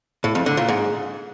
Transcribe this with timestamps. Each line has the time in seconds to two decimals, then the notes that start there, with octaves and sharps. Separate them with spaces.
0.24 A2
0.35 F2
0.46 D3
0.57 A#2
0.68 G#2